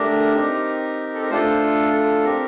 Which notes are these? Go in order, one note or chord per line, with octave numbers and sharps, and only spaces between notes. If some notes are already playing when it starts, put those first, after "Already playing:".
Already playing: A3 D4 G4 A#4
C4 D#4 G4
A4
A#4
A3 D4 F4 A4 C5
A4
C4 G4 A#4